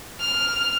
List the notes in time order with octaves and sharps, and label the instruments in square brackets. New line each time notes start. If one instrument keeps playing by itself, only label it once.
[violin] F6